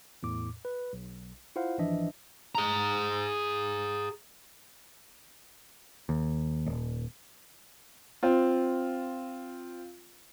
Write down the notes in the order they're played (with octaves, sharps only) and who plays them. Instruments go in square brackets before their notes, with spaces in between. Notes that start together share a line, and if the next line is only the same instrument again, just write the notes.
[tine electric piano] E2 A2 D6
B4
B1
E4 F4 C5 F5 F#5
G#1 E3 F3 D4 D#5 E5
[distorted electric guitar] G#4 A#5
[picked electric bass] D#2
D#1
[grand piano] C4 F4